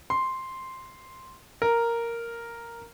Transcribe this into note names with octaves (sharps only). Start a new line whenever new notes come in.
C6
A#4